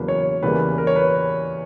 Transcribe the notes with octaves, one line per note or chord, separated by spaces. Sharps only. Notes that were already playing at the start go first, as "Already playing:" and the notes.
Already playing: E2 C#3 F#3 A#3 B4
C#5
E2 C#3 G3 A#3 B4
A#4
C#5
B4